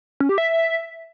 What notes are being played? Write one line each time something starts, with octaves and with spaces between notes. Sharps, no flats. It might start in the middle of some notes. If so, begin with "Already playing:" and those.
C#4
G4
E5